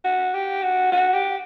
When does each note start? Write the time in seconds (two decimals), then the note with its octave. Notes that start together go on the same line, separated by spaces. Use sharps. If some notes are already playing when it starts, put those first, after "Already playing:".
0.04 F#4
0.33 G4
0.62 F#4
0.92 F#4
1.13 G4